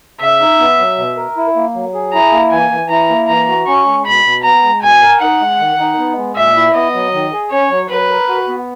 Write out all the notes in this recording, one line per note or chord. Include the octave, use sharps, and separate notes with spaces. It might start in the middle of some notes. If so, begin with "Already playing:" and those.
C#3 E5
D#4
B3
F#3
B2
A#4
E4
A#3
F#3
G#4
E4 A#5
A#3
E3 G#5
E3
E4 A#5
A#3
E3 A#5
F#4
C#4 C#6
G#3
B2 B5
B2
B3 A#5
G#3
B2 G#5
A#4
D#4 F#5
G#3
D#3
D#4
B3
G#3
A#2 E5
E4
B3 D#5
F#3
D#3
G#4
C#4 C#5
F#3
F#3 B4
A#4
F#4
B3